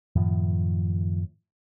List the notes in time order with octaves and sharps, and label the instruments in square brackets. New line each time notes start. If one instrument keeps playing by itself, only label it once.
[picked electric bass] F#2 A2 D#3 F3